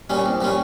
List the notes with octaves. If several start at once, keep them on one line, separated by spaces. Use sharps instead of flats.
A#2 G3 C#4
C2
A#2 G3 C#4